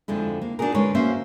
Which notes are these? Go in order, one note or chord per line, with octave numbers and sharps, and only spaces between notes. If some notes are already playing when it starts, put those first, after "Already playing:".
F2 D3 G#3 E4
A#3
D4 D#4 F#4 G#4 A#4
D3 G#3 C#4 A#4 B4 C#5
A#3 C#4 F#4 C5 E5